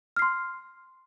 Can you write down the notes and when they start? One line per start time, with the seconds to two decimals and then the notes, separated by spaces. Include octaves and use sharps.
0.16 F6
0.19 C7
0.22 C6